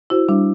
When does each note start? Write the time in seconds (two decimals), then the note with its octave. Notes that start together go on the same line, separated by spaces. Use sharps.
0.10 E4 F#4 C5
0.29 G3 D4